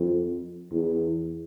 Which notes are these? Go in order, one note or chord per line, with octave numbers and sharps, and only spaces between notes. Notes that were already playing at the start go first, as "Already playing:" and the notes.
Already playing: F2
E2